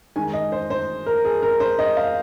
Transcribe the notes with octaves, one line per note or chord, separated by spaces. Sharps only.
D#3 G#3 G#5
D#5
C5
C5
A#4
G#4
A#4
C5
D#5
F5